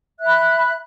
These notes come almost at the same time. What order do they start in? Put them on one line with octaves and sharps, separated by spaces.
E5 F#6 B5